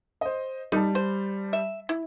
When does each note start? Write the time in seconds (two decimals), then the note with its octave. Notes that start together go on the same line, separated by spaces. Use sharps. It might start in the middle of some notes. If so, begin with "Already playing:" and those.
0.21 C5 D#5
0.72 G3 D#4 A5
0.95 C5
1.53 E5
1.89 E4